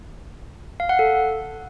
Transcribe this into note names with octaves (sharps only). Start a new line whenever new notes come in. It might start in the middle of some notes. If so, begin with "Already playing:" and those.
F5
F#5
A4